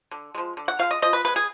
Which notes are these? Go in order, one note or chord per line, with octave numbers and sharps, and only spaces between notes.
D3
F3 G#3
D3
F#5
F3 G#3 F5
D#5
F3 D#5
B4
G#3 B3 B4
G#4